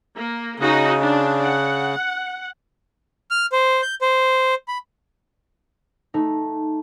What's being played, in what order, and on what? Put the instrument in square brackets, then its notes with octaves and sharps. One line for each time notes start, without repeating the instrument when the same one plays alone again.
[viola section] A#3
[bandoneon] C#3 [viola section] D#4 F#4 D#5
[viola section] D4
F#5
[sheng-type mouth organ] F6
C5
G6
C5
B5
[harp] A3 D#4